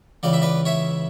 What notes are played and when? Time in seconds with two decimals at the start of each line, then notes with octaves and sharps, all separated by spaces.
0.23 C#2 C#3 E3 D5
0.33 E5
0.42 B4 D5
0.65 C#5 E5